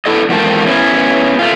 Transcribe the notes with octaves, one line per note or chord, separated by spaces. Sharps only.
A3 B3 D4 E4 A4 D#5
E2 G#2 D#3 C4 F4 A5
B3 C#4 E4
A3 F4